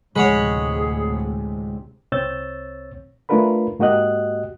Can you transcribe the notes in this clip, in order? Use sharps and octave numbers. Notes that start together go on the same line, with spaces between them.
D2 A2 C3 G#3 G#4 C#5 F#5 B5
C2 C4 C#5 E6 G6 A6
A3 D4 F4 A#4 B4 B5
G#2 A#3 F#4 G4 D#5 F#6